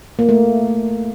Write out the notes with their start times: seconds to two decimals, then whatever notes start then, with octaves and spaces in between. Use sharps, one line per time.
0.19 A#3
0.29 A3